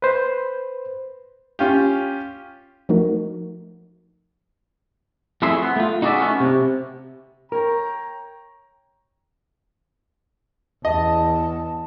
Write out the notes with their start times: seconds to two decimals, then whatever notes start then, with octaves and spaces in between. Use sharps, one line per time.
0.02 B4 C5
1.59 C#4 F4 G4
2.89 F3 A3 D#4 F#4 A#4
5.42 F2 A3 E4 G#4 E5 C6
5.62 B3
5.76 A3 F4
6.02 D#4 F#4 G#4 C#5 D5 E5
6.18 A3 B3 C#4
6.40 C3
7.52 A#4 C#5 G5 A#5
10.85 E2 D#5 A5